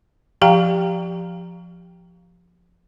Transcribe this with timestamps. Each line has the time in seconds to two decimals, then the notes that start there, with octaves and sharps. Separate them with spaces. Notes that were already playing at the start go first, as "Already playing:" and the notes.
0.42 F3 G4 F5 G5 A#5